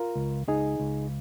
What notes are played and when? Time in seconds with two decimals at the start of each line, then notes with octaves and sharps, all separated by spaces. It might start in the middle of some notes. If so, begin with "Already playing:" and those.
Already playing: F4 A#4
0.16 C#2
0.48 C#2 D#4 G#4
0.80 C#2